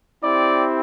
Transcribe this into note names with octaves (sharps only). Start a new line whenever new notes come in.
C4 E4 G4 D5